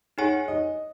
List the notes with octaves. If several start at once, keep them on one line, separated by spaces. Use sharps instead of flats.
D#4 G#4 C#5 F#5 G#5
D#5